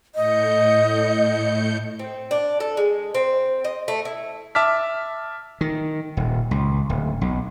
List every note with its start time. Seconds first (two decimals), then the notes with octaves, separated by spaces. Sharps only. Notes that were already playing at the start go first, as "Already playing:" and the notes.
0.15 A2 D#5 G6 C#7
1.99 C4
2.31 D4
2.60 A4
2.77 G#3
3.15 C4
3.64 D#5
3.88 A3
4.05 E4
4.55 E5 A5 D6 F6 B6
5.61 D#3
6.17 D#1
6.51 C#2
6.89 D1
7.21 B1